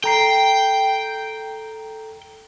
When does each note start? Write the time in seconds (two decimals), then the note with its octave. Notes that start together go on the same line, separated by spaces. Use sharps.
0.04 A4 G5 A#5 C7